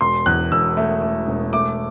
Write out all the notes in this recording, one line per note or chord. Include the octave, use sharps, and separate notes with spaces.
E1 C6
E2 F#6
E1 E6
A3
A3
E1
A3 D6